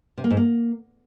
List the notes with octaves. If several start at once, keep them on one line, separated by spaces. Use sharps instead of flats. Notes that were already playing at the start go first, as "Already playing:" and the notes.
C3
A#3
G#2
A#3